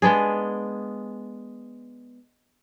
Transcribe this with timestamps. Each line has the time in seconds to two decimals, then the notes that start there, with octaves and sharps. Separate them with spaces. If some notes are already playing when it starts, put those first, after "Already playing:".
0.02 G#3 B3 D4 G#4